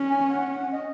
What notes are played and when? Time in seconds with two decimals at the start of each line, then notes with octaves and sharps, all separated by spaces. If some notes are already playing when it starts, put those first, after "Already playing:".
Already playing: C#4
0.09 G#5
0.29 F#5
0.51 F#5
0.72 D#5